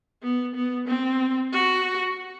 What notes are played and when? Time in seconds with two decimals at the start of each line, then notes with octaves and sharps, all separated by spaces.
0.23 B3
0.55 B3
0.88 C4
1.53 F#4